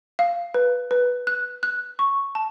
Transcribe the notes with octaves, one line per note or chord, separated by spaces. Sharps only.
F5
B4
B4
F#6
F#6
C#6
A5